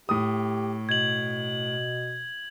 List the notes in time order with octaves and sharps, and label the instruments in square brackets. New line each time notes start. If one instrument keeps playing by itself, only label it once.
[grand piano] A2 D#6 [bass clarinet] G4
[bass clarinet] B2 [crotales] G#6 F#7